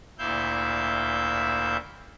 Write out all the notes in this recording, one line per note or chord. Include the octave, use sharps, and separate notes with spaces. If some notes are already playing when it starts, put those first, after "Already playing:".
D2 A#2 E4 E5 F5 G6